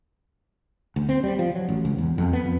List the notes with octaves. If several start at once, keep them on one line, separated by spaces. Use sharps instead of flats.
D2
C4
G3
F3
F#3
A1
C#2
E2
F2
B3
F2